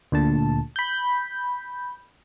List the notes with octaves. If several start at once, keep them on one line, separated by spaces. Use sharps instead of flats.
D2 A#2 D3 A5
B5 G6